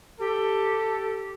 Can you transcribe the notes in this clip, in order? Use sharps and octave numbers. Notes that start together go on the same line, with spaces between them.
G4 A4